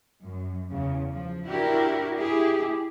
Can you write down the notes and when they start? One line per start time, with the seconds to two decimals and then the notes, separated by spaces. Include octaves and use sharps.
0.24 F#2
0.70 E2 C#3
1.12 F3
1.47 D4 E4 F#4 G4 A#4
2.16 E4 G4 G#4